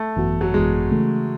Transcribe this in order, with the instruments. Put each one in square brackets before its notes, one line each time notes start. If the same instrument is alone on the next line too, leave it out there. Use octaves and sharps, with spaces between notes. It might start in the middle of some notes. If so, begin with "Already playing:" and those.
Already playing: [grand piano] A3
[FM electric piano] G#1 F#2 E3 B3 F#4
[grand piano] F#3
[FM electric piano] G#1 F#2 E3 B3 F#4 [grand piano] G#3
[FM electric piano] C#3 E3 A3